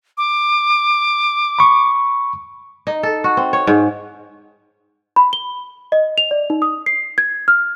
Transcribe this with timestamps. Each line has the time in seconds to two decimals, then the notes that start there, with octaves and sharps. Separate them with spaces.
0.18 D6
1.59 B5 C#6
2.87 D#4
3.03 A4
3.24 F#4
3.37 C4
3.53 C#5
3.67 G#2
5.16 B5
5.33 G7
5.92 D#5
6.18 F7
6.31 D5
6.50 D#4
6.62 D#6
6.86 C7
7.18 G#6
7.48 F6